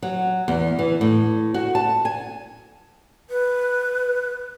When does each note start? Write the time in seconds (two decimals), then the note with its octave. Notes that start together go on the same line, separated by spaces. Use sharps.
0.02 F#3
0.48 E2
0.79 E3
1.01 A2
1.54 F#4
1.75 A5
2.05 G#5
3.29 B4